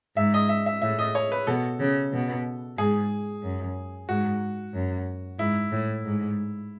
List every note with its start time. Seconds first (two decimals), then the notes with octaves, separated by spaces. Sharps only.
0.17 G#2 E5
0.34 D#5
0.49 E5
0.66 E5
0.82 A2 E5
0.99 D#5
1.15 C#5
1.32 B4
1.47 B2 A4
1.80 C#3
2.13 B2
2.78 G#2 G#4
3.43 F#2
4.09 G#2 F#4
4.74 F#2
5.39 G#2 E4
5.72 A2
6.05 G#2